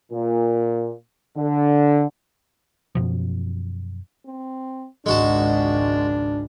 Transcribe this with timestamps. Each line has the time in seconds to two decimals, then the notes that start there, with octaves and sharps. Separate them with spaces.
0.12 A#2
1.37 D3
2.95 F#2 B2 F3
4.26 C4
5.06 G#1 C#2 G#3 D4 F#4 A5